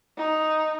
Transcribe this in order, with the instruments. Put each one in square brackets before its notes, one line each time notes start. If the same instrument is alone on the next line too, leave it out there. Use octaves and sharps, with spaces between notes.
[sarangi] D#4